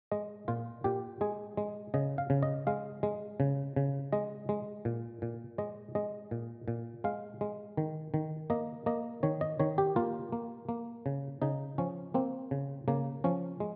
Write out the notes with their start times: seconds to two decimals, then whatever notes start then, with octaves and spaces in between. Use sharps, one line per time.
0.12 G#3 D#5
0.48 A#2 F4
0.84 A#2 G4
1.21 G#3 G#4
1.57 G#3
1.94 C#3 D#5
2.18 F5
2.30 C#3
2.43 D#5
2.67 G#3 F5
3.03 G#3
3.40 C#3
3.76 C#3
4.13 G#3 D#5
4.49 G#3
4.85 A#2
5.22 A#2
5.58 G#3 D#5
5.95 G#3 D#5
6.31 A#2
6.68 A#2
7.04 G#3 F5
7.41 G#3
7.77 D#3
8.14 D#3
8.50 A#3 D#5
8.86 A#3 D#5
9.23 D#3 C#5
9.41 D#5
9.59 D#3 C#5
9.78 G4
9.96 A#3 F4
10.32 A#3
10.69 A#3
11.06 C#3
11.42 C#3 D#4
11.78 F3 C#4
12.14 A#3 C4
12.51 C#3
12.88 C#3 A#3
13.24 F3 C#4
13.60 G#3